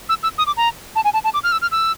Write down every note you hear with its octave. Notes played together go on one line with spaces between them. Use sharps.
E6
E6
D#6
D6
A#5
A5
G#5
A5
A5
D6
F6
E6
F6
E6